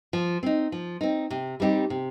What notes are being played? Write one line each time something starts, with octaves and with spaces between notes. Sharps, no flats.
F3
C4 D#4
F3
C4 D#4
C3
G3 C4 D#4 G4
C3